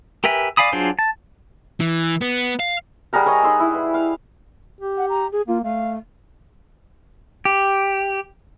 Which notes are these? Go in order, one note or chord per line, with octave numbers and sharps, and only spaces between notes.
G4 A#4 B4 E5 G#5
D5 F5 G#5 B5 D#6
F#3 D4 F4 G#4 C5
A5
E3
B3
F5
G3 G#4 A#4 F#5
A#4 C#5 D#5
D#4 B5 C6 E6
E4
B4
F5
G4
F#5
A#5
G#4
A#3 F4
A3 F5
G4